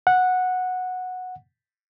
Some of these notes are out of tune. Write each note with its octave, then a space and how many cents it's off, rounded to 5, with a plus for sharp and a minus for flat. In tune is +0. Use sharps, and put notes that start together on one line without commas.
F#5 -10